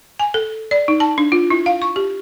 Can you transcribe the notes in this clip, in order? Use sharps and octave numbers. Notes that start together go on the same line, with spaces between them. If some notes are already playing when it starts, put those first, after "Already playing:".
G#5
A4
D5
D#4
A5
D4
F4
E4
F5
C#6
G4